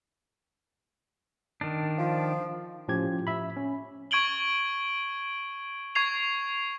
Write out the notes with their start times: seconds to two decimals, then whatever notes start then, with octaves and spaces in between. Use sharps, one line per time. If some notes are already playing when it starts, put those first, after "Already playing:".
1.61 D#3 D4
1.98 F3
2.88 A2 F3 C#4 G4 G#6
3.27 E5 B5
3.56 C#4
4.11 C#6 G#6 D7 F#7 G7
5.95 C#6 G#6 C7 F7